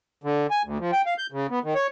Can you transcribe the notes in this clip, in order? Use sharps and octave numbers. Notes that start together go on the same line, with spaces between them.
D3
G#5
D2
F3
G5
F5
G6
C#3
B3
D#3
C#5